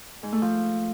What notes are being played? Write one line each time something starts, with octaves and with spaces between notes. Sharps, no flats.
G#2
A3
F3